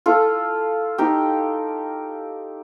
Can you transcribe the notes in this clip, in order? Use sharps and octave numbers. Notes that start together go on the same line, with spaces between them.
F4 A4
D#4 G4